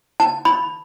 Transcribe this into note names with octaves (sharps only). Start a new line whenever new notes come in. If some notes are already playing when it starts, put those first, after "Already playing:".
A5
B5